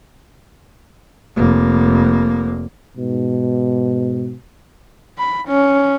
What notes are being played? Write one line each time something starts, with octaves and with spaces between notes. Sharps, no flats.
F1 A#3
G#2 B2
B5
C#4